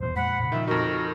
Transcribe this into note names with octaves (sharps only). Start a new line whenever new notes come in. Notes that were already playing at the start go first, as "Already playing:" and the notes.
D#1 E2 B2 C5
F2 A#2 G#3 F#5 B5
A#2 C#3
D#3 F3 E5
F2 D#4 F#4 A#4
F#4